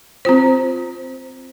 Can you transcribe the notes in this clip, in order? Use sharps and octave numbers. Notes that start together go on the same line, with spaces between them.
C4 F4 C5